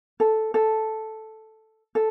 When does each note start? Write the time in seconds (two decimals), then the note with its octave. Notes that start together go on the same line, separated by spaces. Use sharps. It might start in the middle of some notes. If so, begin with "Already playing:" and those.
0.20 A4
0.54 A4
1.95 A4